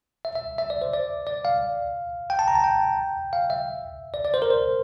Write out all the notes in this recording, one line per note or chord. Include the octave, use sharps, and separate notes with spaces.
E5
E5
E5
D5
C5
D5
D5
F5
G5
A5
A#5
A5
G5
F5
E5
D5
D5
C5
A#4
C5